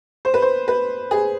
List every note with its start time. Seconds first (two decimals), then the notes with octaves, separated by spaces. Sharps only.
0.25 C5
0.34 B4
0.42 C5
0.68 B4
1.11 G#4